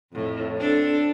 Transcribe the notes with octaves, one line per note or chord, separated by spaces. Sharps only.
F2 A2
C4 D4 A4